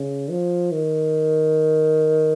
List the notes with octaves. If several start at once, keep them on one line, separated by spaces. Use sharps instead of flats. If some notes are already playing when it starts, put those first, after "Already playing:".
Already playing: C#3
F3
D#3